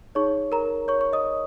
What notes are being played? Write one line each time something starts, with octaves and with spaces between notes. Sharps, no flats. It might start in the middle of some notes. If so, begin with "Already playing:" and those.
D#4 G#4 C#5 C#6
A#4 A#5
C#5 C#6
C#6
D#5 D#6